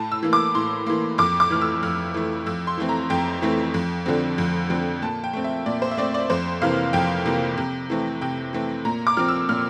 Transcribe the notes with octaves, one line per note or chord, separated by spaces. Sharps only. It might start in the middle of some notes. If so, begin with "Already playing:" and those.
Already playing: A2 A5
E6
E3 A#3
D6
A2 C6
E3 A#3
F2 D6
D6
E3 A3 F6
E6
F2 F6
E3 A3
F2 E6
C6
E3 A3 C4
A#5
F2 G5
E3 A3 C4
F2
D3 F3 C4
F2
D3 F3 C4
A#2 A5
G5
A3 C4
E5
A#2 D5
C5
E5
A3 C4 D5
D5
F2 C5
C3 E3 A#3 F5
F2 G5
C3 E3 A#3
C3
E3 A3 C4
C3 G5
E3 A3 C4
A#2 A#5
D6
F3 C4 F6
E6
A#2 F6